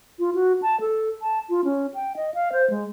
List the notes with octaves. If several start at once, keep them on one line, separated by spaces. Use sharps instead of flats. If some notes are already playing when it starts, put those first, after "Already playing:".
F4
F#4
A5
A4
A5
F4
C#4
G5
D#5
F5
C5
G#3